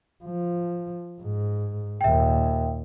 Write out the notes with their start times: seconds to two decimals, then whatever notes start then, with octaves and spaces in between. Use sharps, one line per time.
0.24 F3
1.21 G#2
2.01 D#2 A#2 E5 G5